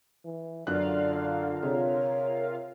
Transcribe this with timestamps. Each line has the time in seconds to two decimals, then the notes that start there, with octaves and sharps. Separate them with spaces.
0.25 E3
0.67 F#2 D3 D4 F4 A#4 D5 F5 F#6
1.63 C3 G#4 C#5